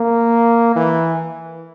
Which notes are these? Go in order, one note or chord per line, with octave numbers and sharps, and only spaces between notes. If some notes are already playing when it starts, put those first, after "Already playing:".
Already playing: A#3
E3